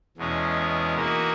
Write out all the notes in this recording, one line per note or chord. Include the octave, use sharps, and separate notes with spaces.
E2 B2 G#3 C#4
E3 A#3 D#4 F#4 A#4